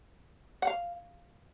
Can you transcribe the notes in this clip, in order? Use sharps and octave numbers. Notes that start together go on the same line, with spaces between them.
F#5
F5